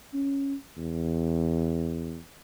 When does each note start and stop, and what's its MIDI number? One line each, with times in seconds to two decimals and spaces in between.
0.14 0.55 61
0.78 2.18 40